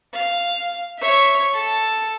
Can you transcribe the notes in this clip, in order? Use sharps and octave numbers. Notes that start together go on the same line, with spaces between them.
F5
C#5 E5
A4